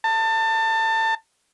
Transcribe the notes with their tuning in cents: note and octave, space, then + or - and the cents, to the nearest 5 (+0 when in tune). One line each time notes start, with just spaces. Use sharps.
A5 +25